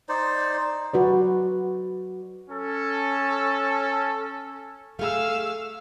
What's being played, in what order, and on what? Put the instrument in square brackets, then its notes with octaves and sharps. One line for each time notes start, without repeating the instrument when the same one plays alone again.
[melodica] D#4 C5 D5
[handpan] F#3 F#4 B4 D5
[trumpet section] C#4 A4
[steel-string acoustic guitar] A3 G#4 [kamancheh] F5 E6